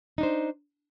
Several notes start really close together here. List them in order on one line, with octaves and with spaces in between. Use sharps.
D#4 D4 C5